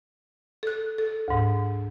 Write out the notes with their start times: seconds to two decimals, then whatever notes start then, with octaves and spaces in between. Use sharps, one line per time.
0.63 A4 F#6
0.98 A4
1.28 D2 G#2